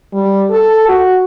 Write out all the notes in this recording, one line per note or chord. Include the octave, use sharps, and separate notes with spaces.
G3
A4
F#4